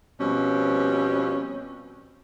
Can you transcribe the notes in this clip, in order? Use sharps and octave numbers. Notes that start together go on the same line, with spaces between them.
B2 F3 G3 C4 C#4